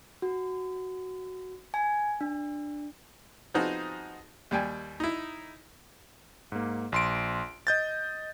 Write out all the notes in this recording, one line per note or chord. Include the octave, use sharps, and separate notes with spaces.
F#4
G#5
D4
F3 B3 C4 D#4 F#4 G#4
D#2 G3 G5 G#5
D#4 E4
G#2 A#3
A#1 C6 D7
D#5 G6 A6